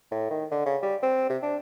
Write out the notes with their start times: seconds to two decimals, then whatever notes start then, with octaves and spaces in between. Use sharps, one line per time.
0.11 A2
0.30 D#3
0.51 D3
0.66 C#3
0.82 G3
1.02 C4
1.29 C3
1.42 D4